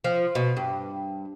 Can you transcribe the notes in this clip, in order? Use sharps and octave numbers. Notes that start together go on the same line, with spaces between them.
F3
B2
G2